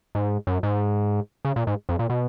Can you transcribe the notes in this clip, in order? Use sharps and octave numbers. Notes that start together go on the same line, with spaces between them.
G#2
F#2
G#2
C#3
A#2
G#2
F2
A#2
B2